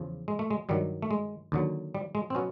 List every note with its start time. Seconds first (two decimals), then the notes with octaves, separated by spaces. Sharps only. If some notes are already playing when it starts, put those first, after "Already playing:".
Already playing: E2 C#3 F3
0.28 G#3
0.39 A3
0.50 G#3
0.69 G2 D#3 F#3 G3
1.02 A3
1.11 G#3
1.52 D#2 D3 F#3
1.95 G3
2.15 G#3
2.30 C4
2.35 B2 F#3 B3 C#4